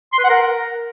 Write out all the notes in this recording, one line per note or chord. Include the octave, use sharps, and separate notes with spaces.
C6
B4
F#5
A#4